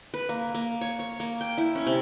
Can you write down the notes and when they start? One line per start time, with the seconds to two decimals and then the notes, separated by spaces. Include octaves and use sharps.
0.14 B4
0.29 A#3
0.54 A#3
0.81 C#5
0.99 C#5
1.20 A#3
1.41 G5
1.58 E4
1.75 C#4
1.87 C3